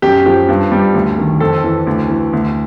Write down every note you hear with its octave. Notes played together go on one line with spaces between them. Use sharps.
F#2 G4
F3 G4
G2
G3
D2
D#3
F2 A4
E3
D2
E3
D2